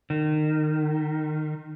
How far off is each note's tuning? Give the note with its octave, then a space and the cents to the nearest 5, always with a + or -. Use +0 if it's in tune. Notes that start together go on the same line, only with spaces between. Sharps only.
D#3 -25